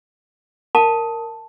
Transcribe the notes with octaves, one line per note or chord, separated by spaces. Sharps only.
A#4 A5